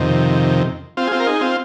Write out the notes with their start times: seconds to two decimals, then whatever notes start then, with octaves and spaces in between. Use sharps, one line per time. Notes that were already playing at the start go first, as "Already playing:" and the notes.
Already playing: F2 C3 D#3
0.97 C4 F4
1.07 G#4
1.12 C4 F4
1.20 A#4
1.27 D#4 G#4
1.41 C4 F4